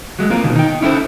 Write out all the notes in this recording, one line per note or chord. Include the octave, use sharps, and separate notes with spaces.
F#3 G#3 A3
A#3 C4 F4 A#4
B2 D#3
D#4 G5
C#4 E4 A4 A#4 C5